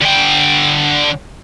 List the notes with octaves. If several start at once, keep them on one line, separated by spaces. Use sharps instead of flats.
D3 G5